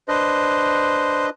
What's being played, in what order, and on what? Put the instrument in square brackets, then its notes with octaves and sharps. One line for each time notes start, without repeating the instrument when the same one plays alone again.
[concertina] D4 B4 D#5 [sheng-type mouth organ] C5